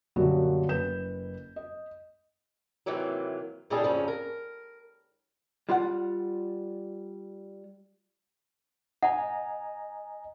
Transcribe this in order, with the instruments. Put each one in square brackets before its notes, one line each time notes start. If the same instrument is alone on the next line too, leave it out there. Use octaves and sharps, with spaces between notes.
[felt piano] F#2 A#2 D3 G3 A#3 F#4
F#1 B4 G6 E7
D#5
[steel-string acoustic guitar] C3 D#3 E3 F#3 A#3
A#2 C#3 G3 D#4 G#4 A4
F2 C#3 F3 C#4
A#4
[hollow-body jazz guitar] G3 F4 D5 F#5
[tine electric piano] D#5 G#5 A#5 [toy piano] F#5